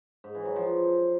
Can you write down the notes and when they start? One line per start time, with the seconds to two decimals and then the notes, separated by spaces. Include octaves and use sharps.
0.24 G#2
0.35 E3
0.45 F#3
0.56 F3